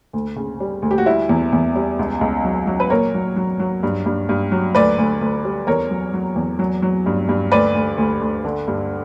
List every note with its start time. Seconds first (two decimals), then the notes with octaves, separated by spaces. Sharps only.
0.13 D2
0.36 C#3
0.60 G3
0.82 D2
0.91 G4
0.98 F#4
1.06 G3 E4
1.29 E2
1.53 E2
1.76 G3
1.99 C#2
2.21 C#2
2.44 F#3
2.67 F#3
2.80 B4
2.90 A#2 A#4 C#5
3.14 F#3
3.36 F#3
3.59 F#3
3.83 G2
4.06 G2
4.29 G2
4.51 F#3
4.75 D2 B4 D5
4.98 D2
5.21 D2
5.45 G3
5.67 E2 A#4 C#5
5.90 F#3
6.14 F#3
6.36 E2
6.59 F#3
6.82 F#3
7.06 G2
7.29 G2
7.52 D2 B4 D5
7.75 D2
7.98 D2
8.21 D2
8.45 D3
8.68 G2